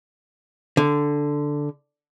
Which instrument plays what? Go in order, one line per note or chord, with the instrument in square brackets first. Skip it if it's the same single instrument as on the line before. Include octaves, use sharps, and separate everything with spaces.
[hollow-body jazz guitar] D3